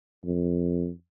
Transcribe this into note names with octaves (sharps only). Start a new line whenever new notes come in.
F2